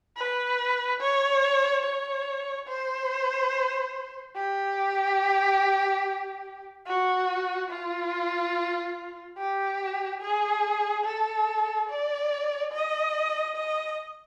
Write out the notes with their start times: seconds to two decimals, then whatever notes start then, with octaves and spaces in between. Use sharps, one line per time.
0.16 B4
1.00 C#5
1.84 C#5
2.68 C5
4.35 G4
6.86 F#4
7.70 F4
9.37 G4
10.21 G#4
11.04 A4
11.89 D5
12.72 D#5
13.55 D#5